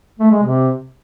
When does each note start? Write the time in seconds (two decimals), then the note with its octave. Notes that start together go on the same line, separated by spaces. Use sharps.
0.19 A3
0.31 G#3
0.43 C3